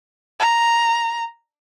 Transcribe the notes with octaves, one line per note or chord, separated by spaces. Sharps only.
A#5